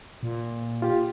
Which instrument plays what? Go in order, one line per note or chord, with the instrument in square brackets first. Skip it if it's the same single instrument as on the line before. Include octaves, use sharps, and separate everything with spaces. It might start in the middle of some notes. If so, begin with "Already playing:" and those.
[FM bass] A#2
[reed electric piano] F4 G4